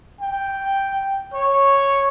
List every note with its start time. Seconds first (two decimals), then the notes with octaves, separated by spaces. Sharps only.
0.21 G5
1.34 C#5